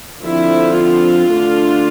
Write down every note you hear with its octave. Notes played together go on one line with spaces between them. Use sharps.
D3 F3 C4 E4
F4
D3 A3 D4